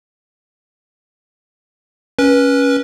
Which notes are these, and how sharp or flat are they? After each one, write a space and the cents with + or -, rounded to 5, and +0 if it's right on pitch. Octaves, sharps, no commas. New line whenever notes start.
C#4 +0 B4 -25